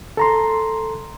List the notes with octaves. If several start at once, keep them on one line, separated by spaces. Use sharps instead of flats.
A4 A#5 C6